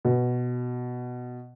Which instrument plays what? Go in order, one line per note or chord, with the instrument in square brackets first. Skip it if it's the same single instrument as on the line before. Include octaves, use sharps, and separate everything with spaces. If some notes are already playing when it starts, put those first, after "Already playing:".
[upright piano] B2